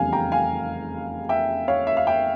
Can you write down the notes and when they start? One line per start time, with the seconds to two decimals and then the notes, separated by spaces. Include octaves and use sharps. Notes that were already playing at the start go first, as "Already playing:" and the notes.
Already playing: F1 E2 C#3 G3 F5 G#5
0.13 G5 A#5
0.32 F5 G#5
1.29 E5 G5
1.68 C#5 F5
1.87 E5
1.97 F5
2.07 E5 G5